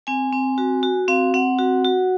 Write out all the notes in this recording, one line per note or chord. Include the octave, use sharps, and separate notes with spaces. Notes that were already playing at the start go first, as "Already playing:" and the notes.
C4 G#5
C4
F#4
F#4
C4 F5
C4 F#5
F#4
F#4